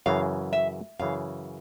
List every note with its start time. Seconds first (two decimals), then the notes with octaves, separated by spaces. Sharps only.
0.06 F#2 C#3 E3 F5
0.53 E5
0.99 F#2 C#3 E3 F5